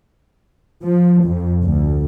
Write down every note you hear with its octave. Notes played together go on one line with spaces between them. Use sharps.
F3
F2
D2